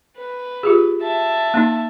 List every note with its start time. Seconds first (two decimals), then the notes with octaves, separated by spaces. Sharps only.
0.17 B4
0.63 F4 G4 G#4
1.02 E5 A5
1.54 A#3 C#4 D#4